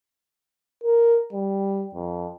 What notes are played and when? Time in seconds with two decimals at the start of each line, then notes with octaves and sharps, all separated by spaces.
0.84 A#4
1.33 G3
1.95 F2